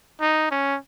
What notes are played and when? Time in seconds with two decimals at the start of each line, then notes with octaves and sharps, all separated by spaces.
0.21 D#4
0.51 C#4